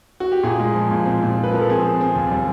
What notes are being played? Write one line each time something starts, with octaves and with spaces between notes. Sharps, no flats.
F#4
G4
A#2 G#4
G#3
F3
A#2
C4
A#2
F3
B4
F3 A#4
A4
C4 G#4
C4
C4
D#2
G3